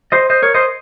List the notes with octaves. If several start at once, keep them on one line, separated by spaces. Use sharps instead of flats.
C5 D#5
C5 D#5
A#4 C#5
C5 D#5